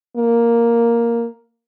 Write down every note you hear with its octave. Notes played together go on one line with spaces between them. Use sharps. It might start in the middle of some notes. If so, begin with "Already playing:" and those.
A#3